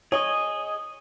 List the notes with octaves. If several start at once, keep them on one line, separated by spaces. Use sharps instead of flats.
G#4 C#5 D#5